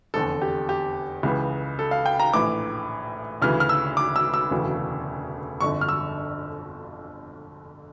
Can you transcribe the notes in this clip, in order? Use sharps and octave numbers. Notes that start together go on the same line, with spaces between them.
F1 E2 D3 A4
G4
G4
C#2 C#3 E3
A4
F5
G5
A#5
A#1 A2 E3 D6
D2 C#3 E3 F6
F6
E6
D6
E6
E6
E1 D2 C#3 E3
G1 F2 D3 C#6
F6
E6